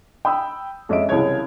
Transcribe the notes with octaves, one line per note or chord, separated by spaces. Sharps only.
G5 B5 D#6 E6
F2 G#3 C#4 D#5 E5 D7
C2 C#3 E3 G#4 C#5 G#6